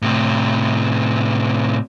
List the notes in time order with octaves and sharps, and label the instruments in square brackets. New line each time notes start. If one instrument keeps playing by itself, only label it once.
[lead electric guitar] A2 C3